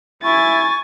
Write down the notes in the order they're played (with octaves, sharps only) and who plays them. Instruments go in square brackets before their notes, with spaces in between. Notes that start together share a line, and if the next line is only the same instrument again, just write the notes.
[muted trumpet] E4 [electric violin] G#5 A6 [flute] C#6